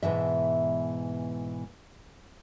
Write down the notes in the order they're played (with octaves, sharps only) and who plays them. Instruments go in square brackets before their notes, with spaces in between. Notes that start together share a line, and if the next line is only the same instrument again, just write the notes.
[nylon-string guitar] G#2 B2 E3 E5